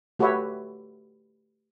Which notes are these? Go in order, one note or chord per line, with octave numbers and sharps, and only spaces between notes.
A3 F#4 G4 B4 C#5 E5